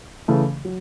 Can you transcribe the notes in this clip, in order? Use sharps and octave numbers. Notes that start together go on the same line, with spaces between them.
C#3 E3 A3
F#3